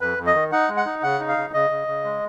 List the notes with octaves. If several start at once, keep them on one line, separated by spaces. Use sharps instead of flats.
F2 B4
F2
D#5
D#3
D#4 F#5
G#3
F#5
D#4
C#3 F#5
D#4
F5
C#3
C#3 D#5
C#3
C#3
G#3